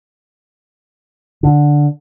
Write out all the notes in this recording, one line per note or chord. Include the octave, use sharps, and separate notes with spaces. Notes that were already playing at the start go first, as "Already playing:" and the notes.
D3